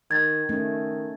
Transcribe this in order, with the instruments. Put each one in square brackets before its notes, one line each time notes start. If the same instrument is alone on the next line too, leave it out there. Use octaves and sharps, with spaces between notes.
[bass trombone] D#3 [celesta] G#6 A6
[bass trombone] D#3 [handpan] A3 C#4